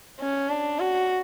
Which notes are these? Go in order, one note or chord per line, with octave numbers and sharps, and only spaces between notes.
C#4
D4
F#4